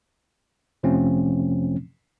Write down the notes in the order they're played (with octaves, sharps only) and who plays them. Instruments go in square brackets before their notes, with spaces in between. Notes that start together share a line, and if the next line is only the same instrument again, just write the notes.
[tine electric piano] F2 C3 F3 A3 C4 C#4